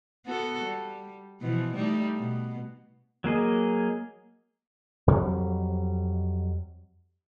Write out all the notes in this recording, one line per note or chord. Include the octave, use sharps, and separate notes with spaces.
B3 F#4 A4
G3
B2 E3 F3
G3 A3 D#4
B2
F#3 A#3 G#4 D#5
F2 F#3 G3